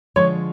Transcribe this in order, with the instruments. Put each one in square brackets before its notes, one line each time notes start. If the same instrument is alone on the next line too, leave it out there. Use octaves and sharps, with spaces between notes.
[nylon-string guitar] D3 F3 G#3 [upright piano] C#5